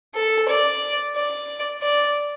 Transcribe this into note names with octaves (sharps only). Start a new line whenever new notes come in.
A4
D5
D5
D5